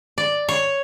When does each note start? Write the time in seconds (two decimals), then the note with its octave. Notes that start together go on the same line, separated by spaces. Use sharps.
0.18 D5
0.49 C#5